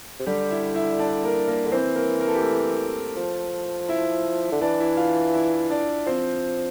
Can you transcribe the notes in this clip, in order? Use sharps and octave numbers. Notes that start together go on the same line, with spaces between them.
C3
D3 G3 G4
E4 E5
E4 E5
D4 D5
A#3 A#4
A#3 A#4
D3
E3 C4 C5
A#3 A#4
A#4
A4
G4
A3 A4
F3
E4 E5
D3
E3 D4 D5
E4 E5
F4 F5
E4 E5
D4 D5
F3 C4 C5